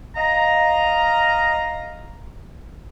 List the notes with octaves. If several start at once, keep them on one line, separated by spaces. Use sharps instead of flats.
D#5 F5 A#5